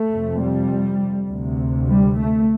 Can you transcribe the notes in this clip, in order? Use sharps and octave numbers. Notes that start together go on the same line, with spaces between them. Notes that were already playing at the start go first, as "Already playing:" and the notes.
Already playing: A3
F2 C3
G3
D2 C3
G3
A3